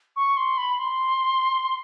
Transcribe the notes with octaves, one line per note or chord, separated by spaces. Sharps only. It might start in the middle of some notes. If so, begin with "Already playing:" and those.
C#6
C6
B5
C6